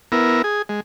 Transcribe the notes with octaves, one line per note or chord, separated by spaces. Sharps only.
B3 E4 A#4
G#4
G#3